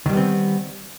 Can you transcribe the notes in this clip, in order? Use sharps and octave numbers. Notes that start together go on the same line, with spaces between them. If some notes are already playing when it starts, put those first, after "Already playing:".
D#3 G3 B3 C4